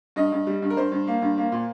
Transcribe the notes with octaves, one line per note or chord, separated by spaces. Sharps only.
G2 D#5
G2
G3
G2
A#4
G2 C5
G2
A#3
G2
A#3
A#2